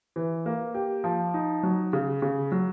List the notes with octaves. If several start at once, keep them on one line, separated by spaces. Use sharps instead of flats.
E3
A#3
G4
F3
D#4
F#3
C#3
C#3
F#3